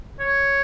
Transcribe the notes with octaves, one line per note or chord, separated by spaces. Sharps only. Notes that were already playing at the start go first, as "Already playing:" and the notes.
C#5